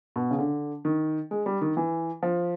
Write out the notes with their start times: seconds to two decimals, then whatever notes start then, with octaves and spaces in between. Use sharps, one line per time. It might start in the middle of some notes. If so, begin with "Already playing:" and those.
0.16 B2
0.31 C#3
0.39 D3
0.85 D#3
1.31 G#3
1.46 G3
1.61 D#3
1.77 E3
2.22 F3